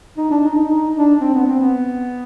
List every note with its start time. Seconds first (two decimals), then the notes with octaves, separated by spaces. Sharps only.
0.17 D#4
0.31 D4
0.44 D#4
0.56 D#4
0.70 D#4
0.95 D4
1.21 C4
1.34 B3
1.47 C4
1.60 B3